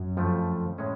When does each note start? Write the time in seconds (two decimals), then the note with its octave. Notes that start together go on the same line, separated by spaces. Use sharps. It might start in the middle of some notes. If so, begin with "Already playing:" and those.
Already playing: F#2
0.17 F2 F3 A3
0.78 A2 G#3 C#4 G#4